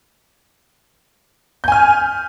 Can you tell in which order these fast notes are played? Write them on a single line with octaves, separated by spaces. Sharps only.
G6 G#5 F6